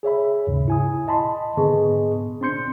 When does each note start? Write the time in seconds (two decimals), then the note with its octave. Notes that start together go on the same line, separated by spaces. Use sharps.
0.03 G#4 C#5 E5 B5
0.47 D#2 G#2 C#3
0.68 E4 G#5 D#6
1.08 D#5 A5 B5 C6
1.57 G#2 D3 B3 G#4 D#5 C#6
2.41 C4 D4 C6 G6 C#7